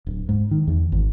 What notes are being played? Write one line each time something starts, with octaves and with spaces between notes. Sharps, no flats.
D1
G#2
D#3
E2
G#1